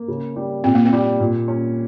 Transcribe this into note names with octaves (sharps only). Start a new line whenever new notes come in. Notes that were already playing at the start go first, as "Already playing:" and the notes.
Already playing: A#3
C#3
G3
A#2 C4
A#3
C4
G3
A#2
C#4